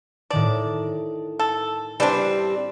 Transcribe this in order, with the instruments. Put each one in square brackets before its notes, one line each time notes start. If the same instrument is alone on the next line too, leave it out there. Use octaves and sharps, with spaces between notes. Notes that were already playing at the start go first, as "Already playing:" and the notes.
[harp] A2 D#3 A5 [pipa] D5
[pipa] A4
[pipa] E3 D4 [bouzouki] G3 C4